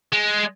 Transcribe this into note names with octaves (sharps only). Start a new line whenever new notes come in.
G#3